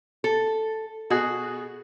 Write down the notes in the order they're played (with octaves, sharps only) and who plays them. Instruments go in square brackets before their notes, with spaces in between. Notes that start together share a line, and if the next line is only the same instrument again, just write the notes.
[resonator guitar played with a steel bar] A4
[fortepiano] B2 G#4 [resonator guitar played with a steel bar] F#4